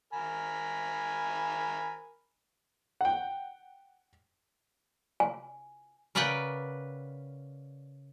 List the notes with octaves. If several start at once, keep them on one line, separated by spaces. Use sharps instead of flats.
A#4 G#5 B5
F#5 G5
G#5
C#3 A#4 B4 D5 F#5 G5